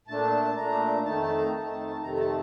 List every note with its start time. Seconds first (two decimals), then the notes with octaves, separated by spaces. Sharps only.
0.07 A#2 A3 D4 A5
0.56 A#2 A3 D4 A#5
1.05 F2 D#3 A3 D#4 A5
1.22 A5
1.37 A#5
1.53 F2 D#3 A3 D#4 A5
2.02 F2 C3 D#3 A3 A#5
2.14 A#5
2.19 A5